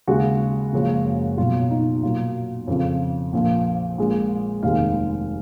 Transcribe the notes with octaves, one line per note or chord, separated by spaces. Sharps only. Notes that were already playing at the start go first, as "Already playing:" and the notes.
D#2 C#3 G#3 F#4
F#1 F#2 F3 G#3
B1 B2 F#3 F4
D#4
B1 A#2 F#3 F4
F2 C#3 F3
A#1 A#2 F3
A#1 A#2 G#3
F1 D#2 D#3 G#3 F5